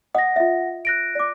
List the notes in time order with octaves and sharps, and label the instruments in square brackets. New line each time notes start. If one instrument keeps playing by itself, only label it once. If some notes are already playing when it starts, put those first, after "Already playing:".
[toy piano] D#5 D#6 [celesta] F#5 A#6
[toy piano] F4 E5
[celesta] F#6 A#6 D7
[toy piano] D5 D6